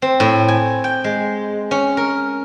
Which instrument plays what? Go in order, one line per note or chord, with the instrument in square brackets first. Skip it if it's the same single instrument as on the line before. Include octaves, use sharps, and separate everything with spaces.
[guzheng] C4
A2
G#5
G5
G#3
C#4
A#4